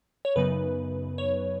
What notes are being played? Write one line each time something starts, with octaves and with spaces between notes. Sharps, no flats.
C#5
F#2 C#3 F#3 B3 D#4 B4
C#5